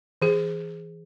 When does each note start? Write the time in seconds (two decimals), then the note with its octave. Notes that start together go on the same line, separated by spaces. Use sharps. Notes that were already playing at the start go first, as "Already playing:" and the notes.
0.22 E3 G#4